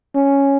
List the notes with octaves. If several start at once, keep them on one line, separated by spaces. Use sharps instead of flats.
C#4